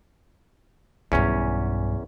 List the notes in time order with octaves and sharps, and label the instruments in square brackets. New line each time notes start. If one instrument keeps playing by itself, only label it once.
[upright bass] B1 G2 [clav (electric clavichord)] E2 C#4